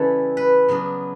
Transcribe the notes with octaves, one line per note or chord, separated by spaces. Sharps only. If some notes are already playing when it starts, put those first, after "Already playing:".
Already playing: C#3 E3 G3 C#4 E4 A4 B4
B4
C#3 F#3 B3 D4